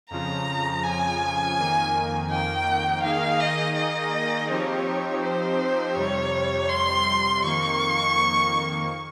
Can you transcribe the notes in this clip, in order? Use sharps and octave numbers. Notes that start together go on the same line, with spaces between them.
F2 C#3 F3 A#5
G#5
F2 D#3 A#3
G5
D#3 A#3 D#4 G#4 F5
D#5
D#5
F3 C4 D#4 G4 C#5
C5
F2 C3 G3 C#5
C6
F2 D#3 A#3 C#6